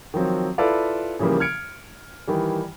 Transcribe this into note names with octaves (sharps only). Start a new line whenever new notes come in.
D#3 F3 F#3 C4
E4 F4 A4 B4 D5 F5
C#3 E3 F3 G3 A#3
F6 G#6 C#7 D7
D#3 E3 G3